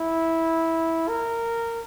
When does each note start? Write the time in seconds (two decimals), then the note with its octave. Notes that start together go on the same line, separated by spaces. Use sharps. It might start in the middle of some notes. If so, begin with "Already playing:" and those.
Already playing: E4
1.08 A#4